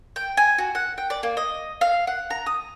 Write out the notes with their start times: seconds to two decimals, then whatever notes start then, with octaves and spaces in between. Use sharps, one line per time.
0.16 G5
0.37 G#5
0.58 F#4
0.75 F#5
0.98 G5
1.10 D5
1.23 A#3
1.37 D#5
1.81 F5
2.07 F#5
2.30 A#5
2.46 D#6